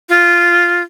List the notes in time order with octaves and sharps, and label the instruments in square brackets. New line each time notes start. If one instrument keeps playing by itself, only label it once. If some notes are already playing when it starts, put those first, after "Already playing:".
[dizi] F4